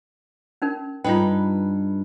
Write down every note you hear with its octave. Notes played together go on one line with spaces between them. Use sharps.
C#4 D#4 A#4
G2 D#4 F4 B4 G5